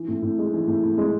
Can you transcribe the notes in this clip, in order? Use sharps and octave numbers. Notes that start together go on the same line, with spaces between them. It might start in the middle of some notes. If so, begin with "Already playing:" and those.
Already playing: E3
A2
A2
G#3
E3
A2
A2
G#3